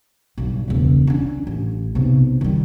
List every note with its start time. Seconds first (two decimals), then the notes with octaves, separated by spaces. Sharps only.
0.38 B1 G2
0.68 E1 C#2
1.07 C#4 D4
1.47 A1
1.95 B1 C3
2.41 D#3 G3